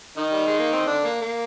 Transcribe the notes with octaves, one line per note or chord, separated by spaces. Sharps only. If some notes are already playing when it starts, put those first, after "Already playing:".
D#3 D#4
G3
G#3
A#3
C4
D3 D4
A#3
A#3